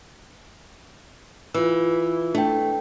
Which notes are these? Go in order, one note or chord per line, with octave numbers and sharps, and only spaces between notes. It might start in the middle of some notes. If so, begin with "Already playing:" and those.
E3 F4 E6
A3 D4 G5